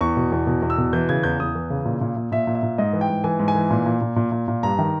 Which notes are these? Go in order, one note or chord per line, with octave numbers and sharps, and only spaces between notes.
E2 C#6
B2
E2
B2
E2
E6
B2
E3 G6
C#3 G#6
E2 G6
E2 D#6
E3
C#3
A#2
A#2
A#2
A#2 E5
A#2
E5
A#2
G#2 D#5
E3
G5
G#2
E3 G#5
G#2
G#5
E3
A#2
A#2
A#2
A#2
A#2
A#2
G2 A#5
D#3